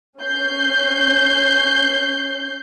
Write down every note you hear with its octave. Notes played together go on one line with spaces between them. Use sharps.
C#4 G6 C7